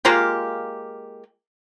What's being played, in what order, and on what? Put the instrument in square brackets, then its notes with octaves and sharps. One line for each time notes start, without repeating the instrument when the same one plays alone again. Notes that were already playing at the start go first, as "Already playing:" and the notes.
[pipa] G#3 A#3 F4 G4